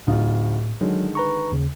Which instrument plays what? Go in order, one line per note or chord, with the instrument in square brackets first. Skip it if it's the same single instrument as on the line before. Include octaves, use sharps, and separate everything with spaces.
[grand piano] D1 D#4 F4 [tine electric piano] A2
[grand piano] D3 D#3 G#3 [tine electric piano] F#3
[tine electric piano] B4 A#5 C#6
D#2 C#3